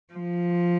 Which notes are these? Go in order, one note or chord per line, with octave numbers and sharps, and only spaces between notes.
F3